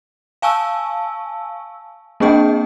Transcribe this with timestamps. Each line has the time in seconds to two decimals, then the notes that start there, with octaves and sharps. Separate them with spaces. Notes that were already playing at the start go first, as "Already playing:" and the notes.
0.42 F5 G#5 A5 C#6 E6
2.20 A#3 C4 D4 G#4 D#5 G5